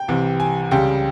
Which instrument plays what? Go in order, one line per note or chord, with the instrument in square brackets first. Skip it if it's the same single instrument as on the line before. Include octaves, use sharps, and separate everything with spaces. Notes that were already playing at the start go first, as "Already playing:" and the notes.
Already playing: [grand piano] G5
C2 C3 E3
G#5
C#2 C#3 G3 G5